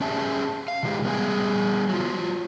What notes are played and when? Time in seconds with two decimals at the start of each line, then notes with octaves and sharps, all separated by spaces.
0.01 C#4 G4 G#4 E5 A5
0.68 F5
0.83 C3 E3 G#3 G4
1.04 G3 B3 G#4 B4 G5 G#5
1.89 F#3 F4